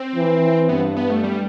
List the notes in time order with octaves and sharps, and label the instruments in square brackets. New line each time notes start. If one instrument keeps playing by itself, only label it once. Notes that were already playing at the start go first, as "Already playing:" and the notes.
Already playing: [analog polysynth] C4
[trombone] E3
[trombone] G2 [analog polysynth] B3
[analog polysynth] B3
A3
G3